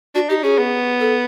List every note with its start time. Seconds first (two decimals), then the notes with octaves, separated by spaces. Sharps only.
0.15 D4 F#4
0.29 D#4 G4
0.43 C#4 G#4
0.58 B3
1.00 A4